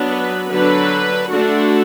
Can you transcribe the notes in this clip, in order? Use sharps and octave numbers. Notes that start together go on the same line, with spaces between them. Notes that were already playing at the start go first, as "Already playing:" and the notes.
Already playing: F#3 B3 D4
B4
D3 F#3 D4 B4
D3 A3 D4 F#4